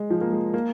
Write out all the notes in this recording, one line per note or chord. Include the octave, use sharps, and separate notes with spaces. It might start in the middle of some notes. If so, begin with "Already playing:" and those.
Already playing: G#3
F3
A#3
G#3
A#3